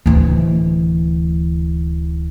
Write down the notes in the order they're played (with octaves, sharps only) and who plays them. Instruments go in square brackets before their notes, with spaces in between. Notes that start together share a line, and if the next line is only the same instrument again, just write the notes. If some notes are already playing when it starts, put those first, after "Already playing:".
[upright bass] D1 E3